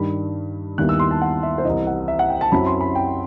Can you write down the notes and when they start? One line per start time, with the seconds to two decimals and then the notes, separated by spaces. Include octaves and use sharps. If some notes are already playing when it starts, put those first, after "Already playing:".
Already playing: G2 D#3 G3 B5
0.78 D#2 D#3 G3 B3 E4 F#6
0.89 E6
1.00 C6
1.11 A5
1.22 F#5
1.43 E5
1.58 C5
1.65 C2 C3 E3 D#5
1.87 F#5
2.08 E5
2.19 F#5
2.30 G5
2.41 A5
2.52 F#2 F#3 C4 E4 B5
2.66 C6
2.81 B5
2.95 G5